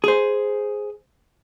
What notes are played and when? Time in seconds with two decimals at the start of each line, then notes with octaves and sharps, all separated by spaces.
0.04 G#4 C5